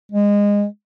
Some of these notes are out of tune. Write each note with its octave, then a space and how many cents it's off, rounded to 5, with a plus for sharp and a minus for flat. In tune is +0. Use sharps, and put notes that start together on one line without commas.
G#3 -20